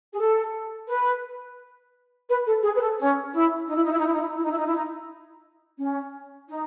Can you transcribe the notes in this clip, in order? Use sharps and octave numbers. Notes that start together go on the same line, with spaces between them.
G#4
A4
B4
B4
A4
G#4
B4
A4
C#4
E4
D#4
E4
D#4
E4
D#4
E4
D#4
E4
D#4
E4
D#4
E4
D#4
E4
D#4
C#4
D#4